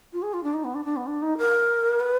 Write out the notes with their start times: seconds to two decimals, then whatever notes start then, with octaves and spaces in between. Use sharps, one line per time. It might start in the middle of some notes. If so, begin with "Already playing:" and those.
0.13 F4
0.22 G#4
0.33 F4
0.43 D4
0.54 D#4
0.64 B3
0.75 D4
0.85 D4
0.96 B3
1.07 D4
1.22 D#4
1.38 A#4
2.00 B4